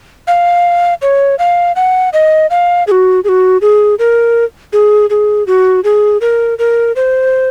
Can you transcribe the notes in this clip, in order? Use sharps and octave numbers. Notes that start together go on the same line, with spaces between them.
F5
C#5
F5
F#5
D#5
F5
G#4
F#4
G#4
F#4
G#4
A#4
G#4
G#4
F#4
G#4
A#4
A#4
C5